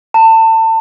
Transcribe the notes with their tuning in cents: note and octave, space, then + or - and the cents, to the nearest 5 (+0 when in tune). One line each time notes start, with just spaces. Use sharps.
A5 +30